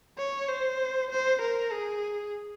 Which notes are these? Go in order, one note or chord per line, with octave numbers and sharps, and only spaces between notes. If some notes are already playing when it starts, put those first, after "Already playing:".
C#5
C5
C5
A#4
G#4